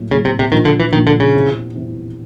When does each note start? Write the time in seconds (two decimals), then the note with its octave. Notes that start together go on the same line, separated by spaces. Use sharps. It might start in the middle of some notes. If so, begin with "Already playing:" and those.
Already playing: A2 F#3 A#3
0.11 A2 C#3 F#3 A#3
0.25 C3
0.39 C3
0.52 A#2 D#3 F3 A#3 D4
0.65 D3
0.80 E3
0.93 A#2 D#3 F3 A#3 D4
1.07 D3
1.20 C#3
1.34 E2 C3 E3
1.74 E2 C3 E3